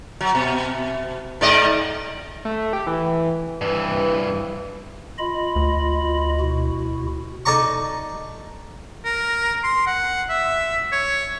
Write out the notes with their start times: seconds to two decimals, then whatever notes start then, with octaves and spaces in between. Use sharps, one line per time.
0.21 F#3
0.35 B2
1.41 G#2 D5 D#5
2.45 A3
2.73 G4
2.87 E3
3.61 G2 E3
5.18 F4 D#5 B5
5.56 D2
6.40 B2 E4 F#4
7.45 D#4 A4 D5 A#5 C#6
9.05 A#4
9.64 C6
9.87 F#5
10.29 E5
10.92 C#5